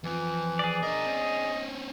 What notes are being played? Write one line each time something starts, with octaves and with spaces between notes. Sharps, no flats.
F2 E3 F3
G#4 D5
D4 A#4 D#5
C4 C#4